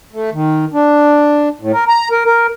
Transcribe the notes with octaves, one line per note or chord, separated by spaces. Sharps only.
A3
D#3
D4
A2
A#4
A#5
A#4
A#4